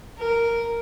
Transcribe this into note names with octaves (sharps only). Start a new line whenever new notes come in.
A#4